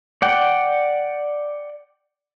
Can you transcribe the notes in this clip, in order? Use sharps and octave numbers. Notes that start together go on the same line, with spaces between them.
D5 F#5 G5